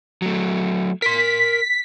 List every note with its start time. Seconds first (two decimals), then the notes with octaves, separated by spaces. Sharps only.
0.22 F#3 A3
1.02 A#4 C6 B6